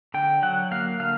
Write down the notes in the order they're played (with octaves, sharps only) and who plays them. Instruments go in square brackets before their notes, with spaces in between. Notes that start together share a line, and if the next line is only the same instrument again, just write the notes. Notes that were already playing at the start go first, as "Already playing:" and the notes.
[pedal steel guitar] D3 G5
F#3 F#5
A#3 F5
D3 F5